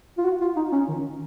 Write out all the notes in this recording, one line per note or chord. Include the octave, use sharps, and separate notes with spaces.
F4
F#4
F4
D#4
C#4
D#3